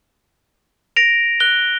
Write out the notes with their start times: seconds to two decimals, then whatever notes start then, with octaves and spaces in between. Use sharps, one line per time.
0.96 A#6 D7 F7
1.40 F#6 G7